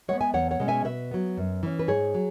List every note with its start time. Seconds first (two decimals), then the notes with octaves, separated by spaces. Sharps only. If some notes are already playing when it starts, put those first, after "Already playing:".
0.08 G#3 B3 C#5 F#5
0.21 E5 G#5
0.34 E2 C#5 F#5
0.51 C#5 F#5
0.60 B2 G#3 C#4
0.68 E5 G#5
0.85 B2 B4 E5
1.11 F#3 B3
1.37 F#2
1.63 E3 C#4
1.79 B4
1.88 G#2 G#4 C#5
2.14 F#3